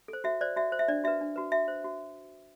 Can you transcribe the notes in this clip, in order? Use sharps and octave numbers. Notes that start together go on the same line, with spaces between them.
A4 C5
F#4 E5
C5 D5
F#4 E5
C5
E5
D4 D5
F#4 B4 E5
D4
F#4 B4
F#4 E5
C5
F#4